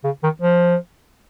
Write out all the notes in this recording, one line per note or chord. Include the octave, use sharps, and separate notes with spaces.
C#3
D#3
F3